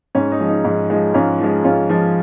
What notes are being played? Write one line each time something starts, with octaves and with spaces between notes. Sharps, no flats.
G#2 C#4
D#4
F3 G#3
D#4
G#2
F3 G#3
G#2 C#4 F4
F3 G#3
G#2 C#4 F4
F3 G#3